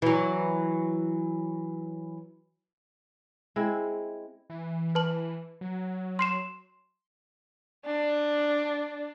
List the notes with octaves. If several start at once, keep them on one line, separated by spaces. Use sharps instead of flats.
E3 F#3
G#3 C4 E4
E3
B4 A5 F#7
F#3
C6 C7 E7
D4